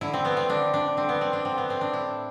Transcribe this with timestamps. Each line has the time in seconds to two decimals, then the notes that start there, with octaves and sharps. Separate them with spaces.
0.01 D3 E4
0.13 C4
0.25 A3 B3
0.37 C4
0.49 D3 D4
0.73 A3 D4
0.97 D3 C4
1.09 B3
1.21 A3 C4
1.33 D4
1.45 D3 C4
1.58 B3
1.69 A3 C4
1.81 D4
1.93 A2 E4